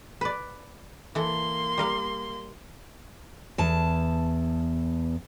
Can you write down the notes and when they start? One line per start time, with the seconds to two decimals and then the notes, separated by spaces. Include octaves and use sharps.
0.21 B4 D5
1.15 E3 A#3 A4 C6
1.78 G3 A#4 F5
3.58 E2 A5